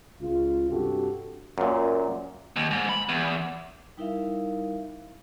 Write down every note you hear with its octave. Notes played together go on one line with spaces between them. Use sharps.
C#2 F4
G2 C3 F#4 G4 A4
F#2 A#2
D#2
G#2
B5
E2
G3 D#4 E4 A#4 E5 F5